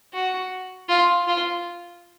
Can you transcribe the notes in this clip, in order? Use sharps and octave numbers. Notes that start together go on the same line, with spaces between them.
F#4
F4
F4